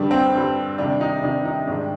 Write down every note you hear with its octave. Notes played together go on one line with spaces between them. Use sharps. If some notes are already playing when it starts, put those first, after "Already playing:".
Already playing: G2 D3 G3 D4
C4
G2 D3 G3
C3 D#3 G3 D4
D#4
C3 D#3 G3 D4
D#4
G#2 D#3 G3 D4